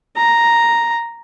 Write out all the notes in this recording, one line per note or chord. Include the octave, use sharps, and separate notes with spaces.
A#5